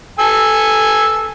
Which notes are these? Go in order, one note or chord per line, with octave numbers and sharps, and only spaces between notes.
A4 G#5 E6